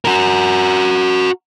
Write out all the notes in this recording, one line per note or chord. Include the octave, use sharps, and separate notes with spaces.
F#4 A#4